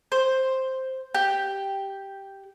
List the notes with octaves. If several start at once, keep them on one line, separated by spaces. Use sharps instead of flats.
C5
G4